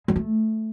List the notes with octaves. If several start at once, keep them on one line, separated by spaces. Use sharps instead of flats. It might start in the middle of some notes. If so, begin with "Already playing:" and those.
G#3
A3